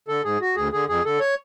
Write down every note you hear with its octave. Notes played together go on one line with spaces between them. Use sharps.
D3 A4
G#2 G#4
F#4
D2 G#4
D3 G#4
F2 G#4
D3 A4
C#5